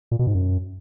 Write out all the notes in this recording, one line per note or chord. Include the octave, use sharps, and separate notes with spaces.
A#2
B2
G#2
F#2